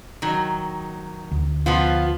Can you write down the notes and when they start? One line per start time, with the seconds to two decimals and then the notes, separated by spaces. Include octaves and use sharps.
0.22 D#3 F#3
1.31 D2
1.66 F3 B3 F4